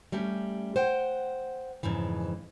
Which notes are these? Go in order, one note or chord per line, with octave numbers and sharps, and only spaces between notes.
G3 A3 C#4 G4
C5 F#5 G5
F2 G#2 C#3 E3